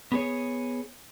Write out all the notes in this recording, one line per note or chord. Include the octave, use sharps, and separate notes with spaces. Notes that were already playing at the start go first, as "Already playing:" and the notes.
B3 G#4 C#5